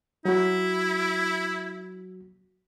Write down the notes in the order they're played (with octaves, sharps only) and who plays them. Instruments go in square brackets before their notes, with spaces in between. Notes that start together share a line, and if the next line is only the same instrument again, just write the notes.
[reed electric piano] F#3 F#4 [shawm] E4